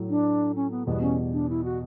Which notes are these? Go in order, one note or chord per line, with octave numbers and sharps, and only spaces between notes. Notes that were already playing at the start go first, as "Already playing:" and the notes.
Already playing: A2 F#3 A3
D4
C#4
B3
E2 B2 G3 B3
C#4
D4
E4
F#4